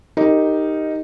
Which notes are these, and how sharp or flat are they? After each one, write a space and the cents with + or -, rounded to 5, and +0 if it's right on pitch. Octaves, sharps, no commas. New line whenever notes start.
D#4 +0 G4 +0 A#4 -20